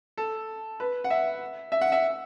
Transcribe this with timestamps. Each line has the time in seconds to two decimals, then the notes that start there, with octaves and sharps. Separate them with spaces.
0.17 A4
0.80 B4
1.04 F#5
1.10 E5
1.72 E5
1.81 F#5
1.92 E5